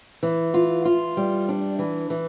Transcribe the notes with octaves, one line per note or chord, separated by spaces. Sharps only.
E3
F4
F4
G3
D4
E3
E3